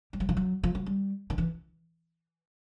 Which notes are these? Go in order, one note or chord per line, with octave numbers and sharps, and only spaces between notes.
G3
F#3
F3
F#3
F3
F#3
G3
D#3
E3